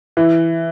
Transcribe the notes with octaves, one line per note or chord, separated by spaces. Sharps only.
E3